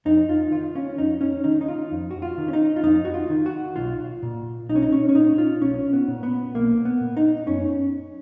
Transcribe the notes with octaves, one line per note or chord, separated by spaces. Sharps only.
F2 D#4
F4
D#3 F4
C#4
F2 D#4
C#4
D#3 D#4
D#4
F4
F2
F#4
F4
D#3
C#4
D#4
F4
F2 D#4
F#4
F4
D#3
F#4
B1 F4
A#2
B1 D#4
C#4
D#4
C#4
C#4
A#2 D#4
F4
B1 C#4
B3
A#2
B3
B1 A#3
B3
A#2
D#4
F#2 C#4